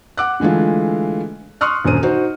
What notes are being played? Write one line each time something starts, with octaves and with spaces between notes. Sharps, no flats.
F#5 D6 F#6
D3 E3 G#3 A3 F4
C6 C#6 D#6 F6 F#6
D#1 F#2 D3 C5 D#7
D#4 F#4 C5